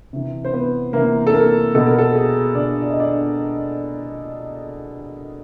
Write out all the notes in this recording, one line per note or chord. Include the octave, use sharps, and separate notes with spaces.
C3 E3
C5
B3 B4
C3 E3 A#3 A#4
A4
A#3 A#4
B2 A4
A#4
A4
G#4
B2 D4 D5
D5
D#5
D4 D5